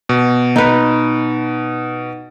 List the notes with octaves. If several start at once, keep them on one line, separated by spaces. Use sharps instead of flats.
B2
D#4 B4